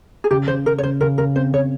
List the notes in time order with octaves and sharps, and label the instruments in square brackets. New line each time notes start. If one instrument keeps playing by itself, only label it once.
[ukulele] G#4
[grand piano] C#3 [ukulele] G4
[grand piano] C#3 [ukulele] C5
[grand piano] C#3 [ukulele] A#4
[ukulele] C#5
[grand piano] C#3 [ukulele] C5
[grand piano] C#3 [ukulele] A#4
[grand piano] C#3 [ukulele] A#4
[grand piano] C4 [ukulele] C5
[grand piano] C#3 [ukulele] C#5